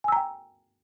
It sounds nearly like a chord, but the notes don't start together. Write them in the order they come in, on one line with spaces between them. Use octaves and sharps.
G#5 E6 A#5 G5